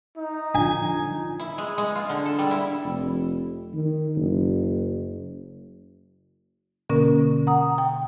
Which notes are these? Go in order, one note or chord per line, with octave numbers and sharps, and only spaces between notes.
D#4
D3 F3 G#5
E4
G#3
G#3
F4
D3
A4
G3
E4
F1
D#3
F#1
B2 D3 A#3 C#4 A#4
F#5 A#5 D#6
G5